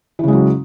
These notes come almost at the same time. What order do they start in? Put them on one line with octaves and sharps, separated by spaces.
E3 C#3 G#3 F#3